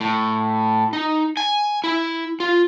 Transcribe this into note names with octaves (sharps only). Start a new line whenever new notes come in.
A2
D#4
G#5
E4
F4